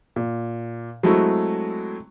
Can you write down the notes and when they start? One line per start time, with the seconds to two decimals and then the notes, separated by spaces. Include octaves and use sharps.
0.16 A#2
1.03 F#3 G#3 A3 C4 E4 F#4